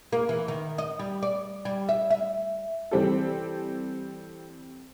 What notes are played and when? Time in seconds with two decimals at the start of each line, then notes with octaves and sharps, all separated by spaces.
0.13 A#3
0.29 E3
0.48 D#3
0.78 D#5
0.99 G3
1.22 D5
1.65 G3
1.89 E5
2.10 E5
2.91 E3 G3 C4 G4 A4